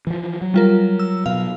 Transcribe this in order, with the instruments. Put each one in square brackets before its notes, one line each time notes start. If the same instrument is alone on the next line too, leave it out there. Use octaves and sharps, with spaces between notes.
[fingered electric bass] E3 F3
F#3
[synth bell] G3 F4 A#4
E6
[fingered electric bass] B2 F#3 [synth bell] F5